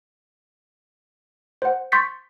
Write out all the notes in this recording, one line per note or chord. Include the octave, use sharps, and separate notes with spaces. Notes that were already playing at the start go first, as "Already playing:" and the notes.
C5 F#5
C6 C#6 G6 A6 B6 C#7